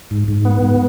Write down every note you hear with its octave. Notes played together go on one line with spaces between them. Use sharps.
G#2
G#2
B3
G#2